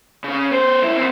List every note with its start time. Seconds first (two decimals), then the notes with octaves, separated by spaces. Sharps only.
0.24 C#3 C#4
0.51 B3 C5
0.82 F#2 E4
0.97 C4 B4